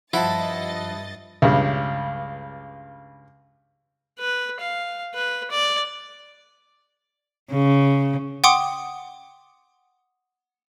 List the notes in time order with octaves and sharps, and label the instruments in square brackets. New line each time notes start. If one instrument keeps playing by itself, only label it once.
[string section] G2 D#5 A6 [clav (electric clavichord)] F3 [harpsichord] E4 [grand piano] F#5 A5
[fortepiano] C#2 G2
[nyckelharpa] B4
F5
B4
D5
[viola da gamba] C#3
[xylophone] F#5 G5 C6 D6 D#6